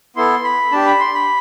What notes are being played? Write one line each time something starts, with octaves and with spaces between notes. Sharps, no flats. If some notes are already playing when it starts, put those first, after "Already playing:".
B3 E4 A4 C6
B5
D4 G4 A5
B5
C6
B5